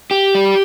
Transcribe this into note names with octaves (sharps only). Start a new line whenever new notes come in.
G4
G3